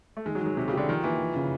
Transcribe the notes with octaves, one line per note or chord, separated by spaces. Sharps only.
A3
D#3 G#3
F#3
D#3
F#3
C3 G4
C#3
D3 G4
D#3 F3
E3 A#3
F3
C#3